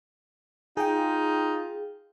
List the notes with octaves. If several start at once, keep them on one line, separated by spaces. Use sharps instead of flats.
D#4 F4 G#4 G5